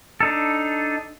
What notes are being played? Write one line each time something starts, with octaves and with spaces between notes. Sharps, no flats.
D4 D#4 A4